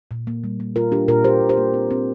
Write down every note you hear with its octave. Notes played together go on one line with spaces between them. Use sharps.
A#2
A#3
G3
A#3
A#2 F4 A#4
G3 D4 G4
A#2 F4 A#4
A#2 G4 C5
A#2
G4 C5
A#3
C4
C4